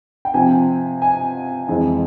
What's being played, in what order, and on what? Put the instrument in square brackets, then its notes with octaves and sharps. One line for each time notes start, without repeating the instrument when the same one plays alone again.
[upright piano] G5
C3 F3 C4 G#5
G#5
F2 E3 G#3 C4